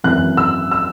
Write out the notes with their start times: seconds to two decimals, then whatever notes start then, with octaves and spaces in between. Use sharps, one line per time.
0.04 G#1 F#2 E3 F#6
0.37 E6
0.71 E6